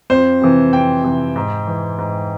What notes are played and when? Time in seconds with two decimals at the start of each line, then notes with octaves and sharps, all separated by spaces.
0.10 F2 C5
0.42 C3 E3
0.73 F2 G5
1.04 C3 E3
1.36 G#2
1.67 E3
1.98 G#2